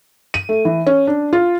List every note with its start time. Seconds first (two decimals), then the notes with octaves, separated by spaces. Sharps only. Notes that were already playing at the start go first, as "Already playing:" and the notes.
0.34 D#7
0.49 A3
0.65 E3
0.87 C#4
1.07 D4
1.33 F4